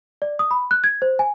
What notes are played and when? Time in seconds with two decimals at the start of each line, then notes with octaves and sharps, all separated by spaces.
0.22 D5
0.39 D#6
0.51 B5
0.71 F#6
0.84 G#6
1.02 C5
1.19 G#5